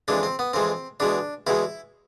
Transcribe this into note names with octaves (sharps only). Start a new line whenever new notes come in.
F2 E3 G#3 D4
C4
B3
F2 E3 G#3 C4
E2 B2 G#3 D4
E2 B2 G#3 E4